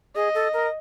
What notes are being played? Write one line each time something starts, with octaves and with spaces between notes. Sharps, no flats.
G#4 D#5
A4
A#4